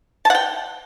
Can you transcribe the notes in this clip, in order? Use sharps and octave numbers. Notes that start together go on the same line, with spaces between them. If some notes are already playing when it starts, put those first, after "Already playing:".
A5
F#5
G5